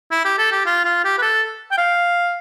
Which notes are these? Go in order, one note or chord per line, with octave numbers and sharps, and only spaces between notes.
E4
G4
A4
G4
F4
F4
G4
B4
A4
G5
F5